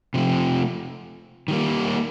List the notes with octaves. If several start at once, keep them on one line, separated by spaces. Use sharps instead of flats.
C3 F3 A3
D#3 G3 A#3